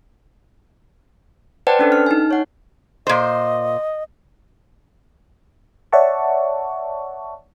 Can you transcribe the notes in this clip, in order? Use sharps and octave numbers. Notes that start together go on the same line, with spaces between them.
B4 C5 D5 F#5 G5 A5
C#4 D4 A4
F6
D#4 G#5
C#5 F#5
A#2 C5 D#5
C#5 D5 E5 F#5 A5 C#6